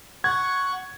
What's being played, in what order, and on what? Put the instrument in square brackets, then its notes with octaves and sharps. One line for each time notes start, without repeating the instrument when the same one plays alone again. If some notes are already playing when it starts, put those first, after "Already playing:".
[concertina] F#5 C#6 [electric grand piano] G#6